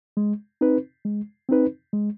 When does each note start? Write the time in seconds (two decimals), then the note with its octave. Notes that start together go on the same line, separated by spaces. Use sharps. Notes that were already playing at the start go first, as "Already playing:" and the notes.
0.17 G#3
0.61 C4 D#4 B4
1.05 G#3
1.49 C4 D#4 B4
1.93 G#3